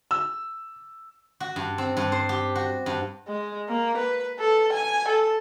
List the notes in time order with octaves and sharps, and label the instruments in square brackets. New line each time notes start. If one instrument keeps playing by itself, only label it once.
[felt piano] E6
[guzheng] F#4
G2
C4
G2
C5
G4
F#4
G2
[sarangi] G#3
A#3
B4
A4
G#5
A4